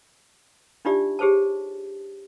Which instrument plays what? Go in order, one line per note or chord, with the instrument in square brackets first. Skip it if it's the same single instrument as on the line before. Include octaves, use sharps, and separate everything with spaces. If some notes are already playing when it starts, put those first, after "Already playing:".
[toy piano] D4 D#4 F4 G4 D5 E5
G4 G#4 C5 C#5 A5